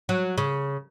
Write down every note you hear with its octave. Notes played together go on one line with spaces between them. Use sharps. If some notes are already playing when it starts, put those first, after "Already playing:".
F#3
C#3